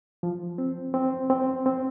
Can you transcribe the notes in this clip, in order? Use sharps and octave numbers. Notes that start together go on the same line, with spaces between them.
F3
C4
C4
C4
C4